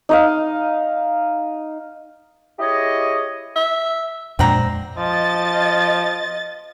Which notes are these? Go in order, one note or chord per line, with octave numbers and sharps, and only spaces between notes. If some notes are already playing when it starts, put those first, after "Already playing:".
D#4 D#5 F5
E4 G4 G#4 C#5 D#5
E5
F2 A#2 G#3 C4 D4 F#5 A#5
F3 D#5 A6